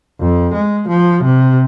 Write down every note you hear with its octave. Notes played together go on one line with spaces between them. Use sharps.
F2
G#3
F3
C3